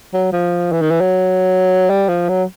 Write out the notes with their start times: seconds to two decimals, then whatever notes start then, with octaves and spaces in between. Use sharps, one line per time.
0.14 F#3
0.32 F3
0.72 E3
0.81 D#3
0.91 E3
1.01 F#3
1.90 G3
2.09 F3
2.29 F#3